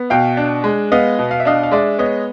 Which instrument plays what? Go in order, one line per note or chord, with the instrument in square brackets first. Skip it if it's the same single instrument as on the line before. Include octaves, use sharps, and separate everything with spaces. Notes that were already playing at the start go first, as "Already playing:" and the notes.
Already playing: [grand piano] B3
B2 F5 G5
D4
G#3
B3 D#5 F5
B2
F5
E5
D4 D#5 F5
F5
G#3 D5 E5
B3 C#5 D#5